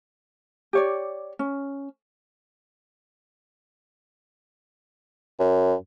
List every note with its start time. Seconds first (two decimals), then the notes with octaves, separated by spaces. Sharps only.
0.73 G4 C#5 D5
1.39 C#4
5.40 F#2